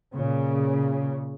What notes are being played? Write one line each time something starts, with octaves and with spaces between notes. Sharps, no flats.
A#2 C#3